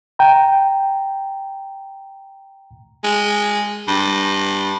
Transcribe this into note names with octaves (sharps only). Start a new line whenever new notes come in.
G5 A#5
G#3
G2